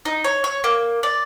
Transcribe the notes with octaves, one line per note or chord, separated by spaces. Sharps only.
D#4
C#5
C#5
A#3
D5